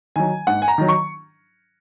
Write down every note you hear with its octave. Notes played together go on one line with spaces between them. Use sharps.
D#3 F#3 G#5
G#2 F#5
G#5
A#5
D#3 F#3
C#6